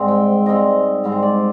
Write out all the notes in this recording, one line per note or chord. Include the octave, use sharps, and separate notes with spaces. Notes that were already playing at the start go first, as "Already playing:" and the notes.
Already playing: G#2 G3 C4
G5
G#2 G3 C4 D#5
G#2 G3 C4
C5
D5